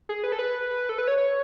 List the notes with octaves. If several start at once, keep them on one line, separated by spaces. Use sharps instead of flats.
G#4
B4
A4
B4
A4
B4
C#5
C#5